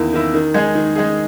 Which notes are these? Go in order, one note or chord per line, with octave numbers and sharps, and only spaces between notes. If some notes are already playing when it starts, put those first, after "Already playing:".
Already playing: E2 D#3 A#3 E4
D#3 A#3 E4
D#3
G#3 D#4 G#4
D#3
G#3 D#4 G#4